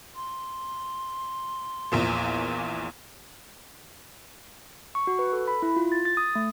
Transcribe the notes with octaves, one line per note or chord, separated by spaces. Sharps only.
C6
A#1 E2 A#2
C#6
F#4
B4
A4
B5
E4
F4
A6
A6
D#6
A3